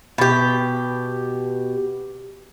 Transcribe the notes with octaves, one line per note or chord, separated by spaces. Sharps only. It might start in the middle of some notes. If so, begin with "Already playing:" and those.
B2 G4